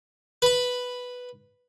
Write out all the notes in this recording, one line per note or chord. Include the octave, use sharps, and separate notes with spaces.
B4 B5